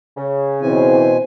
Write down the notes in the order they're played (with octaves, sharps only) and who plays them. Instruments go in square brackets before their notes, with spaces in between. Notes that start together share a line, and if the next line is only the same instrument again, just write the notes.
[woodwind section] C#3
[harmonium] B2 G#5 [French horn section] E3 C4 [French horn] C5